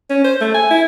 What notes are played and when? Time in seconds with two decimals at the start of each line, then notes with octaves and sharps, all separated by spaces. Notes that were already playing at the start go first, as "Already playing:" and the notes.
0.10 C#4
0.24 C5
0.41 A3
0.54 G#5
0.70 E4